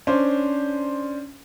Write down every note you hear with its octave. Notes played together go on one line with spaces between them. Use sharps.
C#4 D4 C5